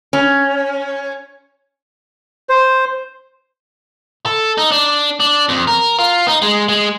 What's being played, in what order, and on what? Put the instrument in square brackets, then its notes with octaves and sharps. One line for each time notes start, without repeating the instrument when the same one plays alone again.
[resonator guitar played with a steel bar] C#4
[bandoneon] C5
[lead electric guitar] A4
D#4
D4
D4
F2
A#4
F4
D#4
G#3
G#3